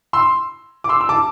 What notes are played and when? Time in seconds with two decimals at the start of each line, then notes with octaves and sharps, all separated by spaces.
0.13 C6 E6
0.84 D6
0.89 C6 E6
1.01 E6
1.09 A5 D6